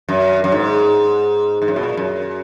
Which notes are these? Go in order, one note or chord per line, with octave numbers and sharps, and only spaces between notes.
F#2
F#2
G#2
G#2
F#2
B2
A#2
F#2